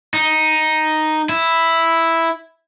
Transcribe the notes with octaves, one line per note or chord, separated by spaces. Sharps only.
D#4
E4